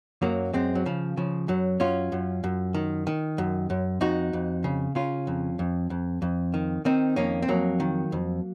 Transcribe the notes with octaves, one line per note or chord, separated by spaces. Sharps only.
F#2 F#3 A#3
F#2 G#3 C4
F#3
C#3 F3
C#3 F3
F#2 F#3
F#2 C#4 F4
F#2
F#2
D#3
D#3
F#2
F#2
F2 D#4 F#4
F2
C#3
C#3 C#4 F4
F2
F2
F2
F2
D#3
D#3 C4 D#4
F2 A#3 C#4
C4
F2 F#3 A#3
D#3
F2